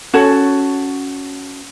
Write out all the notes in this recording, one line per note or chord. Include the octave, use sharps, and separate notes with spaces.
C#4 F#4 A4 C#5